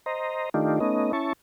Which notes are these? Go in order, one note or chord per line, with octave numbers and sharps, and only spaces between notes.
C5 D#5 A#5
D#3 A3 D4 D#4 F4 G4
A3 B3 C#4 D#4 D#5
C#4 E4 A5 C#6